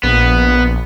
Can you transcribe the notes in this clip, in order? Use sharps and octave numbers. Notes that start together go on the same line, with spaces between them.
A#1 B3